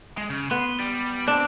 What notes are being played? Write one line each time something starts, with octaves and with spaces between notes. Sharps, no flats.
G#3
C#3
B3 C6
G3
C4 D4